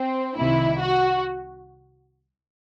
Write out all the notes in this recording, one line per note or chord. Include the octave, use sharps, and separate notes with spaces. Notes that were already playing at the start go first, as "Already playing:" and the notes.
Already playing: C4
C2 C3 D#3 E4
F#4